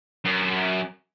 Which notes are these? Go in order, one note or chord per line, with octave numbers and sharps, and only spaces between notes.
F#2